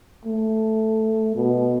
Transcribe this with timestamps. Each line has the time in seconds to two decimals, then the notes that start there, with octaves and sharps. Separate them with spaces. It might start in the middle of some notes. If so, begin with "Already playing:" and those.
0.26 A3
1.36 B2